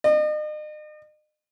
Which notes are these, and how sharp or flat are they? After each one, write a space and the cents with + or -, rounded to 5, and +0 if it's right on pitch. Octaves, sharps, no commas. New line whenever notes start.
D#5 -40